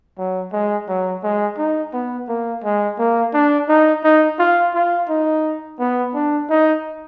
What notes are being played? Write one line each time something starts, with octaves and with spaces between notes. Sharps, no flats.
F#3
G#3
F#3
G#3
D#4
B3
A#3
G#3
A#3
D4
D#4
D#4
F4
F4
D#4
B3
D4
D#4